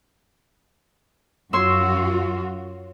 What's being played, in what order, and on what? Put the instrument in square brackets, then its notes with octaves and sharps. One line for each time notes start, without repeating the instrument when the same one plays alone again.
[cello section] F#2 F4 F#4 [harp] C#5 C6 E6